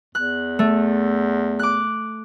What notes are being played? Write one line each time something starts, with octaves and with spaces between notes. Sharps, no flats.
E2 F#6
A3
D6 F#6